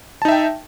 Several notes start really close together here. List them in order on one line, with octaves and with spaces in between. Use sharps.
A5 D#4 E5 G5